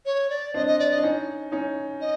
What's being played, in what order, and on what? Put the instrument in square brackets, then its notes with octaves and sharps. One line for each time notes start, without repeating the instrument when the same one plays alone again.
[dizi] C#5
D5
[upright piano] C4 D4 [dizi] D#5
[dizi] D#5
D5
D#5
[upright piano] D4
C#4 D#4
C#4 D#4
[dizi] D#5